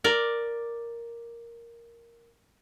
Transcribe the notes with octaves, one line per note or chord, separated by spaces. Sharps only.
A#4 D5